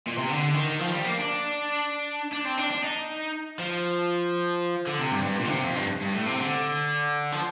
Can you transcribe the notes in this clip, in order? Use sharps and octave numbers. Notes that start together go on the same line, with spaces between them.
A#2
C3
D3
D#3
F3
G3
A#3
D4
D4
C4
D4
D4
D#4
F3
D3
C3
G2
G2
A#2
D3
C3
F2
G2
G2
A2
C3
D3
F3